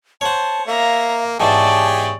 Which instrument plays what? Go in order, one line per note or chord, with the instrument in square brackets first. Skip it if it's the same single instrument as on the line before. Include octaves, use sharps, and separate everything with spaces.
[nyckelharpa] C5 [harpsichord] C#5 F#5 [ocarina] A5
[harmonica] A#3 [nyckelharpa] E5 A#5 [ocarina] F5
[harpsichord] G#2 B2 E3 [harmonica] G4 G#4 C#5 [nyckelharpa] D5 [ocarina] A5